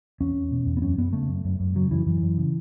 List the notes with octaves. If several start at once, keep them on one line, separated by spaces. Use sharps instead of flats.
E2 C#4
E2
B2
E2
B3
F#2 C#4
F#2 B3
C#3 A3
F#2
F#2
F#2
C#3 F#3
F#2 E3
F#2 E3
F#2
C#3